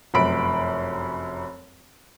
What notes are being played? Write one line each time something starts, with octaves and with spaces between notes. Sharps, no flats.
F1 F#2 B5 D7